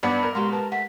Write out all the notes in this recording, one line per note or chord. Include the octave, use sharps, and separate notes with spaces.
G2 B3 B4 D5 F#5
A#4
A#2 G#3 B3 F#4 G4 C6
B4 A5
A3 F#5 B6